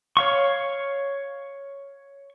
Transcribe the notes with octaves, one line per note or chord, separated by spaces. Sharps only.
C#5 F5 C#6